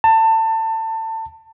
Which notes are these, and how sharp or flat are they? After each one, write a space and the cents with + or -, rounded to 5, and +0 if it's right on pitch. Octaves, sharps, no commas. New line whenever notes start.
A5 +25